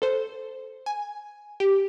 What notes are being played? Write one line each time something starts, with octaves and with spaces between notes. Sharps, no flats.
A4 C5
G#5
G4